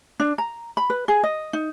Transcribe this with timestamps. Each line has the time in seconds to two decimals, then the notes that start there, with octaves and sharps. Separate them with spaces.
0.20 D4
0.38 A#5
0.77 B5
0.90 B4
1.08 G#4
1.23 D#5
1.53 D#4